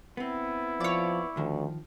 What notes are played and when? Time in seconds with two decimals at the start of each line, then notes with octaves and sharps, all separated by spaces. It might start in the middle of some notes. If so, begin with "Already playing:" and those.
0.17 B3 C4 E4
0.80 F3 C#5 D5
1.37 D2 D#3 F3